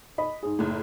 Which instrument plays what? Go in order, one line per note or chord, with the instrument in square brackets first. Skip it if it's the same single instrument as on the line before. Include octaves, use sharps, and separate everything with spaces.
[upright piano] D#5 B5
G#2 G#4
[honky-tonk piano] F#1 A2